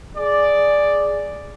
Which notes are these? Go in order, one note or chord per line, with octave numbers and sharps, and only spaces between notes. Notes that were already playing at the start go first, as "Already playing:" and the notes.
G#4 D5